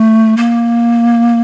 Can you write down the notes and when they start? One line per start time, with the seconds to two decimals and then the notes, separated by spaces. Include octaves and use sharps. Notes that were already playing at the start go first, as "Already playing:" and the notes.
Already playing: A3
0.37 A#3